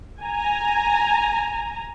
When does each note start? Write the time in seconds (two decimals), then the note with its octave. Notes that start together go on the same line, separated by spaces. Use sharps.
0.22 G#5 A#5